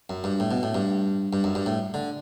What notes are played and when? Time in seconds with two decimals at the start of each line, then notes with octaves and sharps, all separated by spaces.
0.10 F#2
0.24 G2
0.40 A2
0.51 B2
0.63 A2
0.75 G2
1.33 G2
1.44 F#2
1.55 G2
1.66 A2
1.94 D3